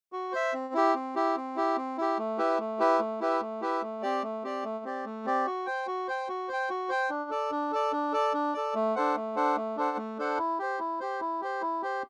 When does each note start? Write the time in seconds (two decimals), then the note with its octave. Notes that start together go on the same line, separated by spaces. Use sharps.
0.13 F#4
0.33 C5 E5
0.53 C4
0.74 E4 G4
0.95 C4
1.16 E4 G4
1.36 C4
1.56 E4 G4
1.77 C4
1.97 E4 G4
2.18 A3
2.38 E4 G4 B4 E5
2.59 A3
2.79 E4 G4 B4 E5
2.99 A3
3.20 E4 G4 B4 E5
3.41 A3
3.61 E4 G4 B4 E5
3.82 A3
4.02 C4 G4 D5
4.23 A3
4.43 C4 G4 D5
4.64 A3
4.85 C4 G4 D5
5.06 A3
5.26 C4 G4 D5
5.46 F#4
5.66 C5 G5
5.87 F#4
6.08 C5 G5
6.29 F#4
6.49 C5 G5
6.70 F#4
6.89 C5 G5
7.10 D4
7.30 A4 D5
7.51 D4
7.72 A4 D5
7.92 D4
8.12 A4 D5
8.34 D4
8.54 A4 D5
8.75 A3
8.95 D4 A4 C5 F#5
9.15 A3
9.36 D4 A4 C5 F#5
9.56 A3
9.77 D4 A4 C5 F#5
9.97 A3
10.18 D4 A4 C5 F#5
10.38 E4
10.59 G4 C5
10.79 E4
11.00 G4 C5
11.21 E4
11.41 G4 C5
11.61 E4
11.82 G4 C5